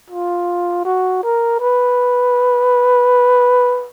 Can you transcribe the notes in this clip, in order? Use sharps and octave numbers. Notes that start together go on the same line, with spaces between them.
F4
F#4
A#4
B4